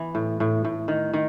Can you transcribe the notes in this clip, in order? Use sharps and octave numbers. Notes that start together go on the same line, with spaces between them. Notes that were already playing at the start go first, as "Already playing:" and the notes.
Already playing: E3 B3
A2
A2
A2
D#3
D#3